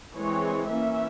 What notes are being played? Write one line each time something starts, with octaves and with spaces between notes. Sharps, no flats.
E3 G#3 C4 C#5
E3 A#3 C#4 E5